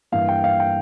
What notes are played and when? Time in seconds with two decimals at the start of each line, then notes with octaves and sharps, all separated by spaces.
0.12 G2 E3 A#3 F5
0.28 G5
0.44 F5
0.60 G5